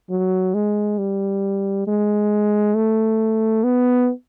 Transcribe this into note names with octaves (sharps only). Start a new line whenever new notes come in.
F#3
G#3
G3
G#3
A3
B3